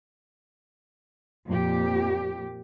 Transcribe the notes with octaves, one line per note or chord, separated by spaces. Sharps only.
F2 A#2 G4